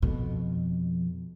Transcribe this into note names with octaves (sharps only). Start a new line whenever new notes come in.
F2 B2